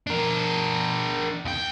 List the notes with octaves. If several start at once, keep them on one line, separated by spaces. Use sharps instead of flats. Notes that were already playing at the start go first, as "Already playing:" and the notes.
D4 A#4
D#2 G5